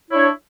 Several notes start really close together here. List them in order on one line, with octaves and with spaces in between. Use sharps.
E4 C#5 D4